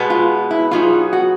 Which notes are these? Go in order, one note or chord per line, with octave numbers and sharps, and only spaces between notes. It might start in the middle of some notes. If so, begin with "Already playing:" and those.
Already playing: B2 G#3 B3
F4
E4
B2 F#3 B3 D#4 F4 G#4
F#4